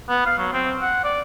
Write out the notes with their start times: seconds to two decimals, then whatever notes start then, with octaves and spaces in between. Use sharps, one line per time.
0.08 B3
0.26 F5
0.38 F#3
0.53 C4
0.82 F#5
1.04 D5